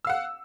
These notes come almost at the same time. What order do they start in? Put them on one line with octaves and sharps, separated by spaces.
E6 F5 F#5